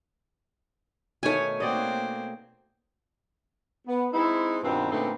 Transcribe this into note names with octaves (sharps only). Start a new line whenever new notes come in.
B2 D#3 A3 C#5 G#5
A#3 C4 F#4 D5 D#5
B3
G#3 C4 D#4 E4
G2 B2 D#3 B3 C4 F4
A#2 D3 A3 B3 C4 D#4